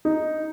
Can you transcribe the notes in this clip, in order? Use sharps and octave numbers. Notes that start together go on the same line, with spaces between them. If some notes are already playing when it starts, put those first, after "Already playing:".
D#4